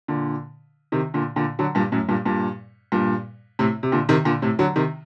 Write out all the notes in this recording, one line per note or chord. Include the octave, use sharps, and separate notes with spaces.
A#2 D3
C3 D#3
A#2 D3
A#2 D3
D3 F#3
G2 A#2
F#2 A2
G2 A#2
G2 A#2
G2 A#2
A2 C3
C3
A#2 D3
C3 D#3
A#2 D3
A2 C3
D3 F#3
C3 D#3